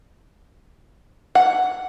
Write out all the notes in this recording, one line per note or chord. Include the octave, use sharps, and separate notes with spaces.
F#5